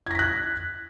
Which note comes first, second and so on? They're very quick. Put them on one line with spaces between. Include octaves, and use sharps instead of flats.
G#6 A#6 B6 F#6